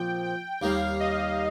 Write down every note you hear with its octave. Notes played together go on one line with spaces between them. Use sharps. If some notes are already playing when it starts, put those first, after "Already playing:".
Already playing: A#2 F3 C4 G5
G5
D#2 D#3 G3 A#3 F5
D#5